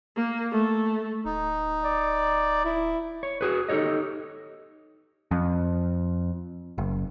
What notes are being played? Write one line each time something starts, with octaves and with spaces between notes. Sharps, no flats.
A#3
A3
D1 D#4
D5
E4
C#5
F#4 G#4 B4
D#4 G4 A4 C#5 D#5
F2
F#1